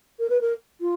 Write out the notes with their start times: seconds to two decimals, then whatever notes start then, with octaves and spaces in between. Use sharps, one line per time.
0.19 A#4
0.30 B4
0.41 A#4
0.81 F4